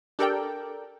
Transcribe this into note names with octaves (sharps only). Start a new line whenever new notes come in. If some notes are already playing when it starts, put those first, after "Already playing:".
D4 G4 A4 A#4 D5 G5